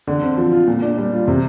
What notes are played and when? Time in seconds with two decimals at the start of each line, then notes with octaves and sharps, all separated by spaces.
0.07 D3
0.22 C4
0.37 F3
0.52 F4
0.68 A#2
0.82 D4
0.98 G3
1.12 F4
1.28 C3